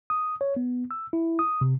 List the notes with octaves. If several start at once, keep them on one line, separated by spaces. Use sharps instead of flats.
D#6
C#5
B3
E6
E4
D#6
C3